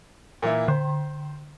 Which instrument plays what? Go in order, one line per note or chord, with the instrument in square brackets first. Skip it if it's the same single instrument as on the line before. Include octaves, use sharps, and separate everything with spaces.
[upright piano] A#2 E3 E4
[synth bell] D3 [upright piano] C5